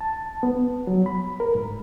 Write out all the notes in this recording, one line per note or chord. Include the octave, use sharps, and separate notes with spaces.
A5
B3
F#3
B5
A#4
G#2